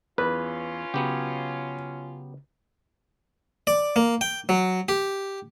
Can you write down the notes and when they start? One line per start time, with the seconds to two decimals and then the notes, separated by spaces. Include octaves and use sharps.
0.18 E2 C#4 F4 B4
0.94 C#3 F#3 B3 G4
3.67 D5
3.96 A#3
4.21 G5
4.49 F#3
4.89 G4